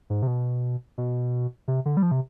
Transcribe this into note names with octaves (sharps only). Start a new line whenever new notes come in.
G#2
C3
B2
B2
C3
D3
G3
F3
C3